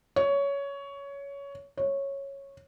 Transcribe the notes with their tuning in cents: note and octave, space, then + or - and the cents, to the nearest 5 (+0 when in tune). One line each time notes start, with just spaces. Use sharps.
C#5 +15
C#5 -10